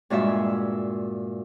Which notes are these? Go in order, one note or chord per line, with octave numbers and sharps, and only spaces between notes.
G2 A#2 G#3 F#4 E5